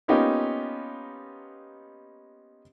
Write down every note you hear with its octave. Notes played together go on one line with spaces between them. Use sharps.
A#3 B3 C#4 D#4 F4 G4